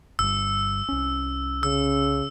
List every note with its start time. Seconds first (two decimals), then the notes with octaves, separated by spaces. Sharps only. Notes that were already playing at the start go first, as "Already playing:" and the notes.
0.19 G1 G2 E6
0.89 C2 C#4
1.63 C#3 E6